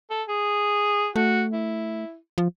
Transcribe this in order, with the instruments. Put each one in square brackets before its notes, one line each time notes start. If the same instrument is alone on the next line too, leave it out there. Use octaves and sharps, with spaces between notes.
[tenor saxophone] A4
G#4
[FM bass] A3 [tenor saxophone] F#4
[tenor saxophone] E4
[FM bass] F3